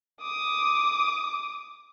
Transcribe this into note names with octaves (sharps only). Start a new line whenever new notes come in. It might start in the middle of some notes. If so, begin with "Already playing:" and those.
D6 D#6